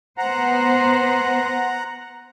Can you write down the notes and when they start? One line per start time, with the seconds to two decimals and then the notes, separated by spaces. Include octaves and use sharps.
0.18 B3 C5 F#5 A#5